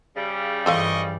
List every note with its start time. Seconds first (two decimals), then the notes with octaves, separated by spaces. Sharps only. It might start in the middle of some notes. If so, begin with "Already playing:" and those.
0.17 C#3 G3
0.66 G2 E3 F3 A4 D#5 F5 C#6